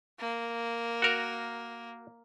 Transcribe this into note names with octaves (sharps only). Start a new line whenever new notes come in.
A#3
F#4 A#4